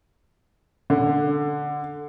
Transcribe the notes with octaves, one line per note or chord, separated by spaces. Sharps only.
D3